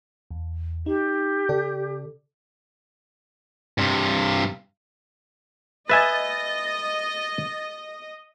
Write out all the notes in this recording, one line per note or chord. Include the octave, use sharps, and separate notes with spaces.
E2
D#4 G4
C#3 A4 D5
G2 C3
B4 D#5 E5 G#5 A6